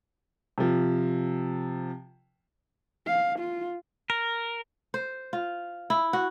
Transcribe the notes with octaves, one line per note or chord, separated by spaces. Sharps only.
C3 F3
F5
F4
A#4
C5
F4
E4
F#4